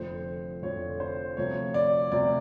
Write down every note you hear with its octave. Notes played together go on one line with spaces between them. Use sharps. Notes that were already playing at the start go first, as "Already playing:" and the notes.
Already playing: F1 F2 D3 F3 C5
F1 F2 D3 F3 C#5
C5
D2 C3 F3 C#5
D5
D2 C3 F3 D5